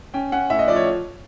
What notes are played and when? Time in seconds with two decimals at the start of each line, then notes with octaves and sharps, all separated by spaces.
0.14 C#4 G5
0.32 C#4 F#5
0.50 A2 E5
0.59 D#5
0.68 F3 D5
0.76 C#5